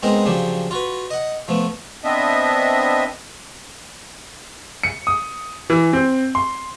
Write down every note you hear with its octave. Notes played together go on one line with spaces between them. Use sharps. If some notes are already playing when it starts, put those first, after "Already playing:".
G#3 B3 C4 D#4 A#4 D#5
C#3 F3 F#3 D4 G4
F4 F#4 B4
D#5 F#5
F3 A3 B3
B3 C4 D4 D#5 E5
C#7
D#6
E3
C4
C6